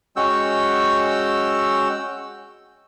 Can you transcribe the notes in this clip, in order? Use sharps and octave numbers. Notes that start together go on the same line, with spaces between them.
G#3 C#4 F#4 G5 E6